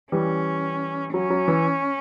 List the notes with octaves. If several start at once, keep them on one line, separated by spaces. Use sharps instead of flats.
E3 G3 C#4
F#3 C#4
F#3
E3